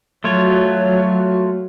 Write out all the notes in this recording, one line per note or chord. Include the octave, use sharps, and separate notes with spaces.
F#3 A3 F4 C#5